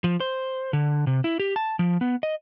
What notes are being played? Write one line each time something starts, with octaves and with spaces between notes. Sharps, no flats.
F3
C5
D3
C3
E4
G4
A5
F3
B3
D#5